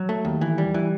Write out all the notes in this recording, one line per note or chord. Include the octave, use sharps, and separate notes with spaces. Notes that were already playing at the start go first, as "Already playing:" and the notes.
Already playing: F#3
A3
D#2
E3
G3
E3